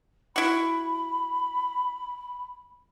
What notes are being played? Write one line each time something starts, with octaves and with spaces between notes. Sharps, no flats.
E4 F#4 B5